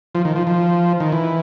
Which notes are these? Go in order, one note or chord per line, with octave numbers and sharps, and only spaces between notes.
F3
D#3
F3
F3
D#3
E3